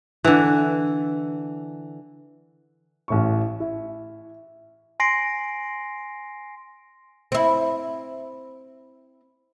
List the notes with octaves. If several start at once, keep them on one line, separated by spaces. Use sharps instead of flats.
D3 E3
A1 A2 C#6
E4
G#5 C6 A#6 C7 D7
C4 E4